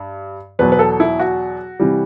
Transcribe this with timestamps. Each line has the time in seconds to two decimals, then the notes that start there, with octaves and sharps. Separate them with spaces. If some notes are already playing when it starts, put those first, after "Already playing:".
Already playing: G2
0.59 E2 B2 F#3 B4
0.72 B4
0.79 A4
1.00 E4
1.19 F#4
1.80 C3 E3 G3